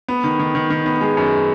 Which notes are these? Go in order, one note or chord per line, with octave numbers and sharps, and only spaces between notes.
B3
D#3
D#3
D#3
D#3
B3
G#3
F#2